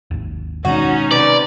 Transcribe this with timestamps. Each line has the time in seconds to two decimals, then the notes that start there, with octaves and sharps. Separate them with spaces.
0.11 G#1 D#2
0.65 B2 D#3 G#3 C#4 D#4 F#4
1.11 C3 B4 D5